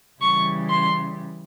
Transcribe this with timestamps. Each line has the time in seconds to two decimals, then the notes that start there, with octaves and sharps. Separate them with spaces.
0.21 C#3 E3 G3 C#6
0.70 C6